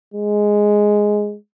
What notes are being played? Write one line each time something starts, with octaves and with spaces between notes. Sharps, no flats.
G#3